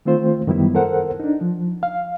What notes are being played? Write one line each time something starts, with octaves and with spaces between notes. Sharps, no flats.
D#3 A3 C4 F4 C5
F#2 D#3 G3 B3 E4
A4 A#4 C5 F#5
D4 D#4
F3
F5